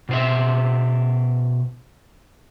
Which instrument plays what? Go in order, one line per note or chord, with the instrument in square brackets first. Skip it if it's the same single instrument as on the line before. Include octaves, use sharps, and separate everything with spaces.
[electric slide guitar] B2 C5 E5